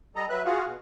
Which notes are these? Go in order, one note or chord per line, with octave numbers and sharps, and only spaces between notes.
G3 A4 D#5 A#5
F#3 B4 E5 F#6
F4 F#4 G#4 F5 F#5
B2